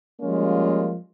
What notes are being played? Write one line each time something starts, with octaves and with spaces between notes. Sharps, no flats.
F3 G3 G#3 A#3 C#4 F4